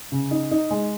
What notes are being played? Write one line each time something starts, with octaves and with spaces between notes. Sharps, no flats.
C#3
D#4
D#4
G#3